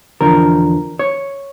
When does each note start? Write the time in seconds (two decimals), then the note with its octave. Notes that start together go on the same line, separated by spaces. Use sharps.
0.21 E2 D3 F3 A#4
0.99 C#5